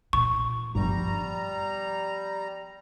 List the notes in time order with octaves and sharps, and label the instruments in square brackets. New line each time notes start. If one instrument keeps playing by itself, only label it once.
[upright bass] A#2 [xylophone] C#6
[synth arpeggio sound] G1 G2 [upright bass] F3 B3 [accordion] G3 A#5